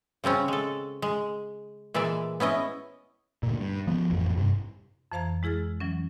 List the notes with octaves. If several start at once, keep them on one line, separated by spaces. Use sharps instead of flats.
C#3 G3 C4 C#4
G#3 A4
G#3
A#2 E3 G#3 D5 E5
B3 C#4 E4 D#5
D2 A#2
G2
F3 B3
A1 F2
G2 C3
F2 E3 C5 F5 A#5 G#6
G#3 E4 G#4 F6 A6
E3 F#3 C#4